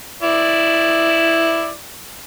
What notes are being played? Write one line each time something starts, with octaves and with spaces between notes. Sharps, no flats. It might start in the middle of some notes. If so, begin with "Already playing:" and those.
E4 D5